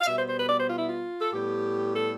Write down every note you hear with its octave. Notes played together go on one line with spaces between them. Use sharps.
F5
B2 G3 B3 E5
C5
C5
B4
D5
C5
F4
E4
F4
A4
A2 G3 B3 G4
A4